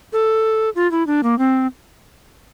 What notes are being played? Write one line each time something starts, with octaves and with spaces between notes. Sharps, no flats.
A4
F4
E4
D4
A#3
C4